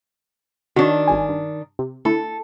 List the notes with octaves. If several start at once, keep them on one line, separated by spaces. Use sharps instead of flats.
D#3 D4 F#4 C#5
G#1 G2 G#5
G2
C3
D3 A3 E4 A4